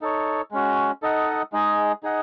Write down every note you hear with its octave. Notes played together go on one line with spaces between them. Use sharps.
D#4 A4 C#5
G#3 C#4 F#4
D#4 A4 D#5 F#5
G#3 D#4 G#4 D#5
D#4 G#4 D#5 F#5